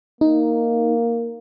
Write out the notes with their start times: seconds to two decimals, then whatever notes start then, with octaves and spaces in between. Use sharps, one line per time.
0.21 A#3 D#4